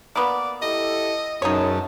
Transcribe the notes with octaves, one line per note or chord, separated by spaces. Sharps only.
A#3 B3 D5
E4 G4 A4 D#5
F#2 B2 D#4 G#4 C#5 A5